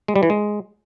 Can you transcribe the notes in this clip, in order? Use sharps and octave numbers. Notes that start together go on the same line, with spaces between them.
G#3
G3
E3
G#3